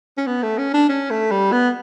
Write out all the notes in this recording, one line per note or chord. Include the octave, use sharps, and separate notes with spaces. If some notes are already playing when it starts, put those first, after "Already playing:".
C#4
B3
A3
C#4
D4
C#4
A3
G3
B3